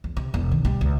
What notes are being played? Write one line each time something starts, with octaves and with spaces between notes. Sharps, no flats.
E2
C3
E1
D#3
G3
C#2